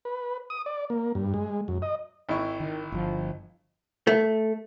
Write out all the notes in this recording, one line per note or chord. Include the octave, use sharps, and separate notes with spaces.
B4
D#6
D5
A#3
G2
G#3
F#2
D#5
G#1 E4 C#6
D#3
G1 F3
A3